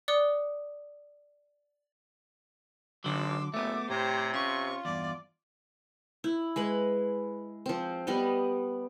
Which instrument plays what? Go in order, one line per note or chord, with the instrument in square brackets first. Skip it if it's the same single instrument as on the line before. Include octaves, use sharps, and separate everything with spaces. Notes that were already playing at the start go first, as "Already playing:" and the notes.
[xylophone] D5 D6 D#6 F#6 C#7 G7
[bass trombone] G#1 [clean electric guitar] D3 F#3 [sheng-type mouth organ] C6 E6 [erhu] D6
[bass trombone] F#1 [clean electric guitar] A3 B3 [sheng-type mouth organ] E5 [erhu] D6
[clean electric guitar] A2 [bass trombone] C3 [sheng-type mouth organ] G4 C#5 A#5 [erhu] C5
[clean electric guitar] C#4 [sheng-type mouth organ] F4 [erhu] C#6
[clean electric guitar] E2 G2 [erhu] D5
[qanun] E4
G#3 B4 B5
F3 C4
G3 B3 B4 D#5